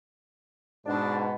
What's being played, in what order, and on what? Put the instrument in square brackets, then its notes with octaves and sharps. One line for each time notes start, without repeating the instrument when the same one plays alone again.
[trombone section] G#2 B2 [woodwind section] D4